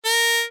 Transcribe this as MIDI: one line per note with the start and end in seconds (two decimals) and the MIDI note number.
0.05 0.42 70